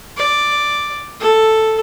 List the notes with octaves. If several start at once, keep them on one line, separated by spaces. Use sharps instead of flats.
D5
A4